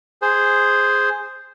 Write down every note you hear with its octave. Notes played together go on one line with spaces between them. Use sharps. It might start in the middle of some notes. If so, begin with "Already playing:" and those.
G#4 C5